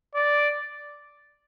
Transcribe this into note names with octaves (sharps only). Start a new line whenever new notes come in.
D5